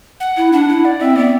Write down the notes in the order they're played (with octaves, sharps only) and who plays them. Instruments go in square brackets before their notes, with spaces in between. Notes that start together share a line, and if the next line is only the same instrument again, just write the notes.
[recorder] F#5
[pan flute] E4
[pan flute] D4 [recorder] F#5
[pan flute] E4
[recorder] D5
[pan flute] C4 [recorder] E5
[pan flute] B3 [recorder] D5